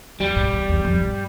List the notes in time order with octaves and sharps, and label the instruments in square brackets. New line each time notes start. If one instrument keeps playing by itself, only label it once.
[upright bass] F2 [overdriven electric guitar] G3
[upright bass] G#2
E2
E2
F2
G2